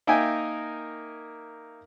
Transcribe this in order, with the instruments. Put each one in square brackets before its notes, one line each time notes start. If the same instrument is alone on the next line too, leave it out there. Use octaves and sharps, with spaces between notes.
[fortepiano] A#3 D#4 A#4 E5 G5 G#5